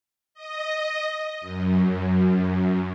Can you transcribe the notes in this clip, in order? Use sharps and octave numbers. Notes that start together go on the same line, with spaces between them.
D#5
F#2